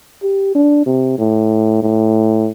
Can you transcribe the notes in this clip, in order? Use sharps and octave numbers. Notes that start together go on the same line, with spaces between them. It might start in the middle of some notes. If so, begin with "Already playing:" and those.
G4
D4
C3
A2
A2